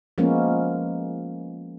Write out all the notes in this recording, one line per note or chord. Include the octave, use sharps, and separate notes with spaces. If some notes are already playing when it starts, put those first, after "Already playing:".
F3 G#3 A#3 B3 C#4